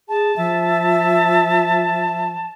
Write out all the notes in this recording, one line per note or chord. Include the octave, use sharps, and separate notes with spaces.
G#4 A5
F3 E5